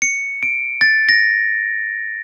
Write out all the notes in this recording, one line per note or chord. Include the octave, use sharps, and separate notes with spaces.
C#7
D7
A6
A#6